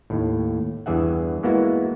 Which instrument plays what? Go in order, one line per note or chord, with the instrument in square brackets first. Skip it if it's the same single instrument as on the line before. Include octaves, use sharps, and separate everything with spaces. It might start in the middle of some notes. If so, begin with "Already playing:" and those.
[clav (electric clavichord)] D#2 A2
E2 G2 E3 G#4 E5 F#5
E3 G#3 A#3 B3 E4 F#4